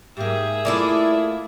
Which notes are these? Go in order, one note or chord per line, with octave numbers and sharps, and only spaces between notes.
G#2 A#3 G4 G#4 E5
A3 A#3 E4 F4 A4 D5